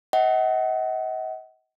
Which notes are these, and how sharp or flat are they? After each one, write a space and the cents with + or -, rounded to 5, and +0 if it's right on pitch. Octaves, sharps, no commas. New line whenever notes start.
D#5 +40 F#5 +30